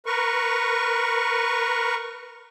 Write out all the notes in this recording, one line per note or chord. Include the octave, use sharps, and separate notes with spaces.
A#4 B4 C#6